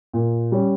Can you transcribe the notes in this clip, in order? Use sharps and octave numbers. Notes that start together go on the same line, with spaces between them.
A#2
G3 C#4